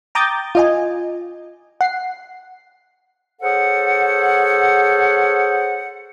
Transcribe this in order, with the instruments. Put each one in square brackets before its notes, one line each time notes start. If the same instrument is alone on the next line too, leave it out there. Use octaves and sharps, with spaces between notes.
[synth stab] G5 A#5 D6 D#6 G6 A6
F4 D#5 G#5
F#5 C7
[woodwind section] G#4 A4 C5 C#5 F#5